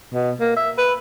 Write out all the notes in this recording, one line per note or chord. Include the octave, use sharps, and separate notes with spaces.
B2
A#3
E5
B4